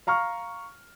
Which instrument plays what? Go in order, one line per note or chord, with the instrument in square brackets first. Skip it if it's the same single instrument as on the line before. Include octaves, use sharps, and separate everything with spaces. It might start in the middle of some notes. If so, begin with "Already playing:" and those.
[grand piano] F5 A#5 C#6 F6